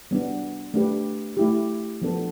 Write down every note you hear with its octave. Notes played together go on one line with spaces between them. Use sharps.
G3 B3 D4
A3 D4 G4 B4
A3 E4 G4
F3 B3 D4 A4